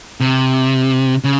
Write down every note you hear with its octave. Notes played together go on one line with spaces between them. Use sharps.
C3
C#3